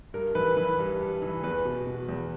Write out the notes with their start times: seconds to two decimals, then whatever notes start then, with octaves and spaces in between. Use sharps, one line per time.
0.14 G2 A#4
0.35 E3 B4
0.57 E3 B4
0.79 G2
1.01 G2
1.22 E3
1.43 E2 B4
1.65 B2
1.87 B2
2.09 E2